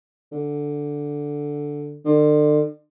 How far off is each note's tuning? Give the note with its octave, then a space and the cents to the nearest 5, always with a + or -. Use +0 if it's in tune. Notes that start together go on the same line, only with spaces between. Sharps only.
D3 -5
D3 +35